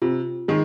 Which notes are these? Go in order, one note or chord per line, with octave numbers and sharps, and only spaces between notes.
C3 F4
D#3 G#3